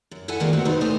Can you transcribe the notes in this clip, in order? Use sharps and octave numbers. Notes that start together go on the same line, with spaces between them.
F#2
E4 A4 F#5 G#5
D#3 G#3 A#3 D4 F4 F#4
A3 C4 F#4
C3 D#4 B4 C5
D#2 A2 A3 C5 D#5 G#5